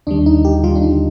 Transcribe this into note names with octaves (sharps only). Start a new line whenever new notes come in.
D#2 D3 G3 D4
D#4
G4
D#2 D3 G3 F4
D4
D#4